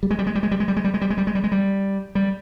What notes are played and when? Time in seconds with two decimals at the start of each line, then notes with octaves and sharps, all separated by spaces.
0.03 G3
0.11 G#3
0.19 G3
0.27 G#3
0.35 G3
0.43 G#3
0.51 G3
0.60 G#3
0.68 G3
0.77 G#3
0.84 G3
0.94 G#3
1.02 G3
1.10 G#3
1.18 G3
1.27 G#3
1.35 G3
1.44 G#3
1.52 G3
2.15 G3